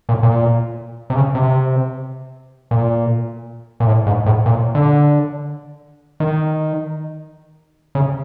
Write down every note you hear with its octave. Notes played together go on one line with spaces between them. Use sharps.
A#2
A#2
C3
C#3
C3
A#2
A#2
A2
G#2
A2
A#2
D3
D#3
C#3